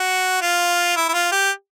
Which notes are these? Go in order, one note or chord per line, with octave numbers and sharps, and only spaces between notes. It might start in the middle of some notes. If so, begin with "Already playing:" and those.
Already playing: F#4
F4
E4
E4
F4
G4